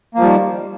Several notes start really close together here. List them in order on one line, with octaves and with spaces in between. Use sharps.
A#3 F3 G3 D#3